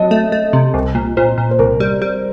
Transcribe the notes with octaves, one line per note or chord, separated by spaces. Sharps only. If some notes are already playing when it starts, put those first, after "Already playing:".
Already playing: F#3 D#5 A5
A3
A3
C3
C2
A#2
A#2 C5
A#2
C5
C2 A#4
G3
G3